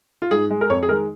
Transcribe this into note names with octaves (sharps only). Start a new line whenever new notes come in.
F4
G#2 G#4
G#3
A#4
F2 C#5
G#4
D#3 G#3 A#4